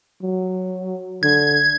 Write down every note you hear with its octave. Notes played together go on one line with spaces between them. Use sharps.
F#3
D3 G#6